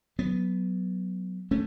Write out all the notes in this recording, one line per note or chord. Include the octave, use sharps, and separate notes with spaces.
F#3 B3
A3 C#4